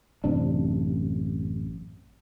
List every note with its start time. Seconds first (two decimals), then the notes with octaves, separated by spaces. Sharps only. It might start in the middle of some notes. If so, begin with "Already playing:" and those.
0.24 A1 F#2 C3 D4